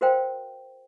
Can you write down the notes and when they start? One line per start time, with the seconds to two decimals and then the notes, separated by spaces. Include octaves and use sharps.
0.01 F#4 A#4 C5 F5 G5